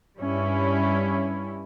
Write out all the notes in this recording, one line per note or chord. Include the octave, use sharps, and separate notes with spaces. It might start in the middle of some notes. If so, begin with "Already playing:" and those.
G2 G3 C#4 E4